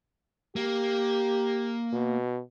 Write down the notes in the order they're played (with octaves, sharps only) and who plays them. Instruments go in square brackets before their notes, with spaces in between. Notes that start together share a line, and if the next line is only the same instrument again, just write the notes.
[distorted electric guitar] A#3 [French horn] G4
[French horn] B2